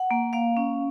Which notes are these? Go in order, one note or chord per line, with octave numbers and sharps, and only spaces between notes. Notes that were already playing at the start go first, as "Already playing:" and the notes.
Already playing: F#5
A#3
A#3 F5
C#4